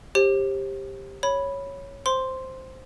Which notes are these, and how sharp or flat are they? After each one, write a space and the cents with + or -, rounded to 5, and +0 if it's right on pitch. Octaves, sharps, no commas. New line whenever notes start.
G4 +10 C5 +40
C#5 +0 B5 -5
C5 +0 C6 +0